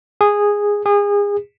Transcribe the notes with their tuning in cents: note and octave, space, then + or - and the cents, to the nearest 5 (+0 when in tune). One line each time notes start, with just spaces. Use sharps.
G#4 -10
G#4 -30